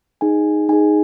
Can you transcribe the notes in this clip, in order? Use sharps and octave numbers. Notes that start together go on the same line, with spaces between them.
D#4 G#4 G#5
D#4 G#4 G#5